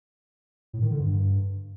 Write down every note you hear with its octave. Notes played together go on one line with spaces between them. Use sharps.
A2
D#3
D3
G2